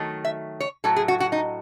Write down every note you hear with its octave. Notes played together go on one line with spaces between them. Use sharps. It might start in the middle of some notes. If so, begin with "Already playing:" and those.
Already playing: D#3 F#3 A3
E5
C#5
A2 F#3 A3 A4
G#4
F#4
F#4
D#4